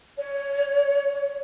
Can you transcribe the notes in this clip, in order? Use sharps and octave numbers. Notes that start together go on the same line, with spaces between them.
C#5